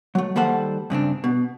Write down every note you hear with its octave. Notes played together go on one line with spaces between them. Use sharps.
F#3 A3
D#3 G3 A#3 A4 C5 F#5
G2 C#3 C4 D4
B2